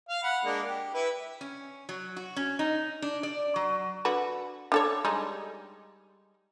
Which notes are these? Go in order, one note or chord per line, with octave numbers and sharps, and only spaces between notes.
F5
F#5 B5
G#3 A#3 D4
G4
E4 B4
C#4
F#3
F#4
C#4
D#4
D4
D5
F#3
D3 F#4 B4
D4 A4 C#5
G3 G#3 D#4